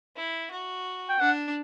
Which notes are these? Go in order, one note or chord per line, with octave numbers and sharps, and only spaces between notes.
E4
F#4
G5
D4 F#5